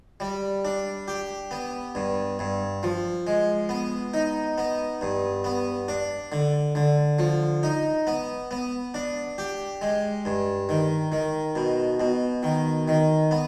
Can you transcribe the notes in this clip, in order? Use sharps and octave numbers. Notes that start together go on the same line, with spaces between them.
G3
D4
G4
B3
G2
G2
F3
G#3
B3
D#4
B3
G2
B3
D4
D3
D3
F3
D#4
B3
B3
D4
G4
G#3
G2
D#3
D#3
B2
B2
D#3
D#3
B3